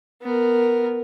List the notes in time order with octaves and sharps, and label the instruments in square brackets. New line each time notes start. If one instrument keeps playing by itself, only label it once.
[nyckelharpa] B3 A#4